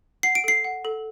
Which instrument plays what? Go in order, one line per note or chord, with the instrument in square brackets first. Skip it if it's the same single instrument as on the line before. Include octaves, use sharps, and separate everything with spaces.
[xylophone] F#5 C7
D7
A4 C7
F#5
A4